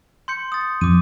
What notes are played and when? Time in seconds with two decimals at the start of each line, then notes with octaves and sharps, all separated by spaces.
0.28 C6 G6 C#7
0.52 D#6 A6
0.81 F2 D6 D#7